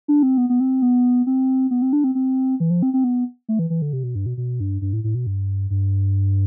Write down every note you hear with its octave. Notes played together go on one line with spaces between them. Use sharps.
D4
C4
B3
B3
C4
B3
C4
B3
C4
D4
C4
C4
E3
F3
C4
C4
B3
A3
E3
E3
D3
C3
B2
G2
B2
B2
G2
G2
A2
A2
B2
G2
G2